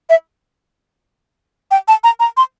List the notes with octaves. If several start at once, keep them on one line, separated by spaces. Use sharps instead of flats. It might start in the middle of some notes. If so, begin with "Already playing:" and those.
E5
G5
A5
A#5
A#5
C6